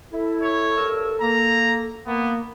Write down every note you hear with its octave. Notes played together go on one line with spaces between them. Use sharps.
E4 A4
C#5
G2 A#4 E6
A#3 A#5
A#3 B3